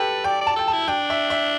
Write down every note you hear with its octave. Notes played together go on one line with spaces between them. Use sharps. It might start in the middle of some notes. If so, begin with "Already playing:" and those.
Already playing: G4 A4 B4
D5 G5
D5
A5
A4 G5
E4 A5
D4 G5
E5
E5